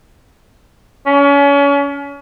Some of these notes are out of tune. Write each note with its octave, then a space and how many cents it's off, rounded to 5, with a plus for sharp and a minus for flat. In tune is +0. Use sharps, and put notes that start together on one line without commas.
C#4 +35